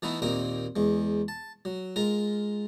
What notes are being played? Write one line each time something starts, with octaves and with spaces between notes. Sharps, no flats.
E3 A3 B3 D#4 E4
D#2 A#2 C4 D#4 A#4
E2 G#3
A5
F#3
G#3 F4 A#4